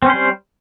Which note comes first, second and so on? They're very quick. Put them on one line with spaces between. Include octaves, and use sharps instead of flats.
C4 C#4 C5 G3